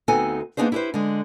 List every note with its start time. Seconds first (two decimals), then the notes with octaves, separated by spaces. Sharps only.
0.08 D2 B3 C4 D#4 A4 G#5
0.57 A#3 B3 D4 D#4 G#4 C5
0.72 E4 G4 G#4 B4 C5
0.94 D3 G#3